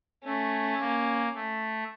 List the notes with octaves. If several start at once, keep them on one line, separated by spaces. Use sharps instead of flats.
A3 C#4
A#3
A3